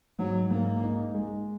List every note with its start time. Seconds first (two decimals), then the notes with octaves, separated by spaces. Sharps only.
0.19 G#2 F#3
0.51 G#2 A#3
0.83 D#4
1.14 G#3